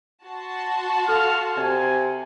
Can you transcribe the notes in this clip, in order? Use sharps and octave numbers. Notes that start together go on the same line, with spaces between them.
F#4 A5 C6
A4 F5 F6
C3 D5 G#5